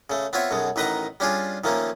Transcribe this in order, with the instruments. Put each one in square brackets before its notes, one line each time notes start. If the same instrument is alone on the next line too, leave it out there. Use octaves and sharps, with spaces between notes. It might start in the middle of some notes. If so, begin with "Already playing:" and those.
[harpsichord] C#3 A3
B3 C4 F4 C#5 E5
B1 F#2 B2 G#3
A1 D#3 B4 D#5 F#5 A#5
G3 C#4 D4 F4 G#4
D#3 F3 A3 A#3 C#4